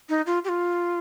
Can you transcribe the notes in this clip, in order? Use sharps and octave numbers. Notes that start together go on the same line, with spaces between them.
D#4
F4
G4
F4